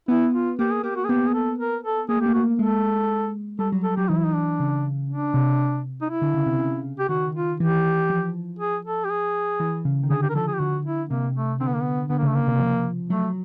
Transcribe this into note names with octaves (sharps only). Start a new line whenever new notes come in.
B3 E4
F4
A#3 G4
G#4
A#3 G4
F#4
G#4
B3 G4
G#4
A4
A#4
A4
A#3 G#4
A3
G4
A#3
F#4
G#3 A4
G3 A4
F#3
A4
F#3 G4
E3 D#4
E4
D#4
D4
C#3
D4
C3
D#4
E4
D3
C#3
C3
C#3
G4
D#3 F#4
F4
E3 G4
F3
G#4
A4
G4
G#4
E3
C#3
D#3
D3 G#4
G4
A#4
F3 A4
G#4
G4
D3 F#4
E4
C3 A#3
A3
D3 C4
B3
A#3
B3
D3 B3
A#3
C#3 A3
A#3
C3
F3
F#3 A3